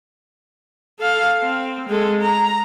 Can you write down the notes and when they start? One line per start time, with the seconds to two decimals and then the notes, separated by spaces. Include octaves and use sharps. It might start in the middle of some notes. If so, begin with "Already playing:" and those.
0.99 A4 F5
1.42 C4
1.89 G#3 A4
2.22 A#5